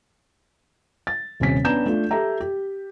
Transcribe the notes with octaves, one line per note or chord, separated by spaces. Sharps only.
A6
D#1 C3 C#4 B6
B3 C#4 D4 A#5 G6 E7
A3 D4 F4
G4 A4 E5 A#5
G4